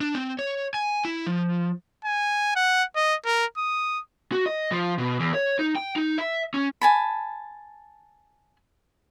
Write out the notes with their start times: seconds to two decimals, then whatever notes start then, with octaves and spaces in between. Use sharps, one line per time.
0.01 D4
0.15 C4
0.39 C#5
0.74 G#5
1.05 E4
1.26 F3
2.05 G#5
2.56 F#5
2.96 D#5
3.25 A#4
3.57 D#6
4.32 F#4
4.46 D#5
4.72 F3
4.98 B2
5.20 E2
5.34 C#5
5.59 D#4
5.75 G5
5.96 D#4
6.18 E5
6.54 C#4
6.81 G#5 A5 B5